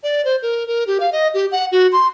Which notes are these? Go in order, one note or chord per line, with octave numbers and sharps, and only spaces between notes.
D5
C5
A#4
A#4
G4
F5
D#5
G4
F#5
F#4
C6